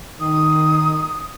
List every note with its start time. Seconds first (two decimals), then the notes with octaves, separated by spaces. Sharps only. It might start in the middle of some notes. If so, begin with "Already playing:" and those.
0.20 D#3 D#6